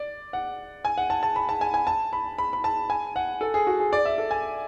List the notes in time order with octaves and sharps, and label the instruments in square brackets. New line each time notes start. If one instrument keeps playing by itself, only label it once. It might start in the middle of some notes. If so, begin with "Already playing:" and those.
Already playing: [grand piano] D5
F#5
G#5
F#5
A5
A5
B5
A5
G#5
G#5
A5
B5
B5
B5
A5
G#5
F#5
A4
G#4
F#4
G#4
D5
E5
A4
G#5